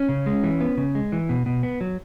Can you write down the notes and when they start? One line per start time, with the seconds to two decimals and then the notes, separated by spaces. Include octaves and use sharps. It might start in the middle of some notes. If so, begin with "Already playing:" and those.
Already playing: C#4
0.09 C#3
0.26 G#3
0.43 E3
0.61 B3
0.78 C#3
0.95 G#3
1.12 E3
1.29 B2
1.46 B2
1.63 B3
1.81 F#3